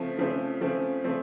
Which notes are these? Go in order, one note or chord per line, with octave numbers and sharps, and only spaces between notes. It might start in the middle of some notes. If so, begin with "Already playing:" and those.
Already playing: C#3 F3 A3 C4
C#3 F3 A3 C4
C#3 F3 A3 C4
C#3 F3 A3 C4